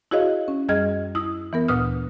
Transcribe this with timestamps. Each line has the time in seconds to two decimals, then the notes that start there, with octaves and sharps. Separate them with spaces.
0.11 E4 F#4 G#4 C#5 D#5 F5
0.48 C#4
0.68 F#2 G3 G#4 D#5 F6 G#6
1.15 E4 D#6 E6
1.53 E3 B3 A#4
1.68 D2 A#2 B4 D#6 F6